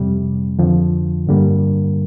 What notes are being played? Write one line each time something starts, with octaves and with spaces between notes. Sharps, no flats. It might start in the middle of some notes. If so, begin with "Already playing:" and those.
Already playing: F2 C3 G3
F2 D3 F3
G2 D3 G3 A#3